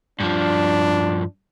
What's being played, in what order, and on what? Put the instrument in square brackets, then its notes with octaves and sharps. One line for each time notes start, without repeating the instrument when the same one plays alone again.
[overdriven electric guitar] G2 F3 [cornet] D4